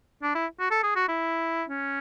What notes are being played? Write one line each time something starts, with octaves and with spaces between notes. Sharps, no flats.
D4
E4
F#4
A4
G#4
F#4
E4
C#4